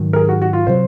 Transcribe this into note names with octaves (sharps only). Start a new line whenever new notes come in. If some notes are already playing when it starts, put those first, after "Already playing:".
Already playing: G#2 D#3 F#3
A#4
G#4
F#4
F#4
F4
C3 F#3 C5